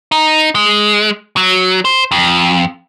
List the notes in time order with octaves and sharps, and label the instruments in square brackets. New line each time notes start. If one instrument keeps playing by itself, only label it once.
[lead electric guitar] D#4
G#3
F#3
C5
F2